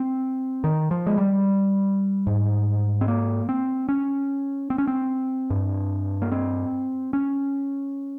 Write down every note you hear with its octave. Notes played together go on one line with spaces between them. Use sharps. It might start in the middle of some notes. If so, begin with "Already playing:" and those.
Already playing: C4
D#3
F3
G#3
G3
G#2
C4
A#3
C4
C#4
C4
C#4
C4
G2
A#3
C4
C#4